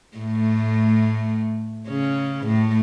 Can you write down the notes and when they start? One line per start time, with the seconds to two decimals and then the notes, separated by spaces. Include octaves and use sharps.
0.17 A2 A3
1.89 C#3 C#4
2.47 A2 A3